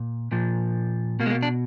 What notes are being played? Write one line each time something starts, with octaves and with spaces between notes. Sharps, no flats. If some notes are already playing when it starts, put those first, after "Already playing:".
Already playing: A#2
A#2 F3
B2 A#3
G#3
A#3
D4